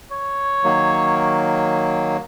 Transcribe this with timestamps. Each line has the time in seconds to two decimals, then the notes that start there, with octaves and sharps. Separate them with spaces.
0.11 C#5
0.64 D#3 F#3 A#3